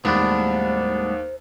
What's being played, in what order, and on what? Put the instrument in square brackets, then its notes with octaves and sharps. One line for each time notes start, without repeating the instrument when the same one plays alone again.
[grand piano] D#2 [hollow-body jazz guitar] A2 G3 G#3 [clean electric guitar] B3 D4 [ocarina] C5